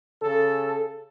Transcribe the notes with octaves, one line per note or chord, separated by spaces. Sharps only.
C#3 A4